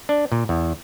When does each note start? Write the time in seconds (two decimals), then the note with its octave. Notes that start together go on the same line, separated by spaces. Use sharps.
0.09 D4
0.32 A#2
0.49 E2